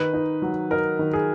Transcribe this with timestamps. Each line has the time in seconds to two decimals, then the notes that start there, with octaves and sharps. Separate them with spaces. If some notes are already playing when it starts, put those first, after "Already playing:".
Already playing: D#3 B4
0.13 D#4
0.42 F#3
0.71 D#4 A#4
0.99 D#3
1.13 G#4